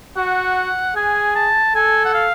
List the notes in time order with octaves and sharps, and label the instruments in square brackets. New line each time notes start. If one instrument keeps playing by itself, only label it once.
[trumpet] F#4 [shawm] F#5
[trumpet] G#4 [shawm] G#5
[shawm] A5
[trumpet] A4 [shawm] G#5
[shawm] F#5
F5